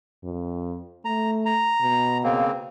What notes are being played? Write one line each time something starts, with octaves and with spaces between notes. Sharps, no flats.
F2
A3 A#5
A#5
B2
C#3 A#3 C4